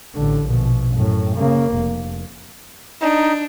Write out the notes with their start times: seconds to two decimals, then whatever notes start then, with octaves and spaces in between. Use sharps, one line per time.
0.15 A1 D3
0.45 A#1 B2
0.95 F#2 A2
1.36 C#3 A#3
1.73 F1
3.02 D4 D#4